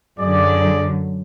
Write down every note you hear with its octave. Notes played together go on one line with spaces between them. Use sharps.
F#2 D3 G#4 D5